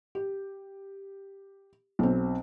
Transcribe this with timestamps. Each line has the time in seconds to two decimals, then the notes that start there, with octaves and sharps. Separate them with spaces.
0.15 G4
1.99 B1 C4